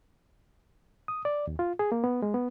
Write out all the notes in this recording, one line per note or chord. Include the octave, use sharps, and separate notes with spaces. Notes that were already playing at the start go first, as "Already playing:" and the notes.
D#6
D5
D#2
F4
G#4
A#3
B3
G#3
B3